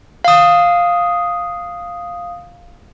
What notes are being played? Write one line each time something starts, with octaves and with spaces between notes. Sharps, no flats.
F5 D#6